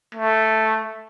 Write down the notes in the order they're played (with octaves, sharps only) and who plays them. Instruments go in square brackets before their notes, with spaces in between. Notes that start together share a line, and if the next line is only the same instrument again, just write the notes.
[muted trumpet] A3